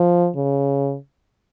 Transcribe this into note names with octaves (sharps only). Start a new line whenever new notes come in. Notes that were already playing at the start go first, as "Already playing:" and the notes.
Already playing: F3
C#3